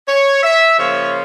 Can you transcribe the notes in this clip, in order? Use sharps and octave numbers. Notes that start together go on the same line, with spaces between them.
C#5
E5
C#3 F3 A#3 F4 C#5